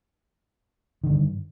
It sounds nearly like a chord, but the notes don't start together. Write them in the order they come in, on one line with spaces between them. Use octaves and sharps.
D#3 D3 G2